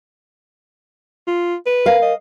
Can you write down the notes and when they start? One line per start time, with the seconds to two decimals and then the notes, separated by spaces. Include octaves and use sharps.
1.27 F4
1.66 B4
1.86 A#4 F5
2.02 D#5